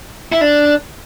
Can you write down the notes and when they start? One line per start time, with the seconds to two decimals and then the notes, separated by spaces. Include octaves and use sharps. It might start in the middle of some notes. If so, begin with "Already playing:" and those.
0.32 E4
0.41 D4